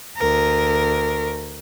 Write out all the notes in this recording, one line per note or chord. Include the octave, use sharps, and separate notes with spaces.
D2 A#4